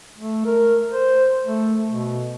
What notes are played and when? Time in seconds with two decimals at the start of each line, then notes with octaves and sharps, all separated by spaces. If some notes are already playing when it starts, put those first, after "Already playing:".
0.18 A3
0.45 A#4
0.93 C5
1.46 A3
1.88 B2